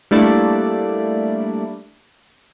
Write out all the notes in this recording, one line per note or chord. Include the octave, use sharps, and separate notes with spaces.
G3 A3 A#3 D4 E4 D5